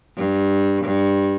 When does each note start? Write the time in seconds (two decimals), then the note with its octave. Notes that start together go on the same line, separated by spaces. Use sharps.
0.17 G2
0.84 G2